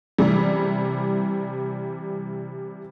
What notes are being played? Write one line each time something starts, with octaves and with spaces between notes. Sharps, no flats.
C3 E3 G3